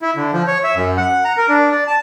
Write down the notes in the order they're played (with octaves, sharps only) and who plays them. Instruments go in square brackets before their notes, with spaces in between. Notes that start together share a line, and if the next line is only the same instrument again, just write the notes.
[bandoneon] E4
D3
F3
C#5
E5
F#2
F#5
A#5
A#4
D4
D5
A5